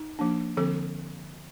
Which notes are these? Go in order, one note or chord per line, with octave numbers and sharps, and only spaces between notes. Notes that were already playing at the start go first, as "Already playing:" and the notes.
Already playing: D#4
F3 A#3 D4
D3 F3 C4 A4